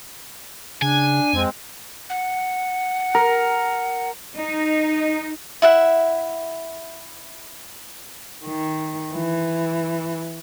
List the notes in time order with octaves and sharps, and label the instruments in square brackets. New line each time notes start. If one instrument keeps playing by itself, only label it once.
[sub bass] C#3 [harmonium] D4 [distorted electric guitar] G#5
[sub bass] F2 [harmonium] G#3 C4
[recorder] F#5
[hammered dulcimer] A#4
[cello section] D#4
[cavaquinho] E4 E5 F#5
[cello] D#3
E3